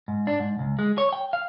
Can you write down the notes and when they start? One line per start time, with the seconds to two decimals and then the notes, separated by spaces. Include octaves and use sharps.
0.08 G#2
0.27 D4
0.40 G#2
0.59 C#2
0.79 G#3
0.98 C#5
1.13 G5
1.33 F5